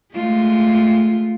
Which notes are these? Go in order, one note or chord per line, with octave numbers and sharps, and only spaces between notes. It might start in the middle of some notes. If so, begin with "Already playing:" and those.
G#3 A3 F4